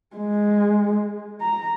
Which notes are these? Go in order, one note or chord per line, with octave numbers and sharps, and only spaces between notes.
G#3
A#5